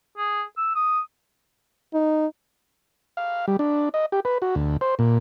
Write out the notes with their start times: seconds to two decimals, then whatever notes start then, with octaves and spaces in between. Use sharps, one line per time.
0.17 G#4
0.57 E6
0.75 D#6
1.94 D#4
3.17 F5
3.48 G3
3.59 D4
3.94 D#5
4.12 G4
4.25 B4
4.42 F#4
4.55 D2
4.81 C5
4.99 A#2